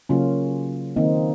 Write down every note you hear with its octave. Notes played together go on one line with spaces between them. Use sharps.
C#3 F#3 A#3 C#4 F4
D#3 A#3 C4 D#4